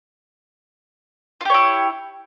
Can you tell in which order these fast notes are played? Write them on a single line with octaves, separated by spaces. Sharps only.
F4 G4 C#5 E4